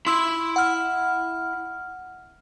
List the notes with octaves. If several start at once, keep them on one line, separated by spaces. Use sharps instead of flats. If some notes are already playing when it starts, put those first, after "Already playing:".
E4 B5 C6 E6
F#5 F6